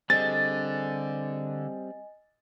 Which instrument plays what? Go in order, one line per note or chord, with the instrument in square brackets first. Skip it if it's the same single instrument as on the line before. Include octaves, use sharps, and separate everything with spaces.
[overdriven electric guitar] D3 [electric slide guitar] G3 C4 G#4 [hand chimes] D#5 G#5 [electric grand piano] A6